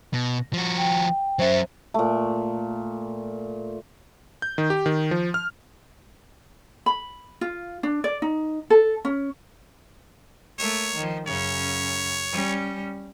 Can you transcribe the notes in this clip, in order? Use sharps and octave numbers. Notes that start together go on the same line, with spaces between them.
B2
F3 F#4
G5
F#3 C#4 C5 E5
A#2 A3
G6
D#3
G4
D#3
F3
F6
B5
F4
D4
D5
D#4
A4
C#4
A3 A#3 C#5
D#3 F3
F#2 C#3 C#5
G3 C#4